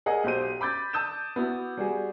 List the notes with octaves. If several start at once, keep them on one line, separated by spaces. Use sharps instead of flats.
G#4 A#4 D#5 F#5
B1 G4 C5 D#7
B5 D6 G6 A6
A5 D#6 G6 E7
B3 E4 F#4
G3 F#4 G#4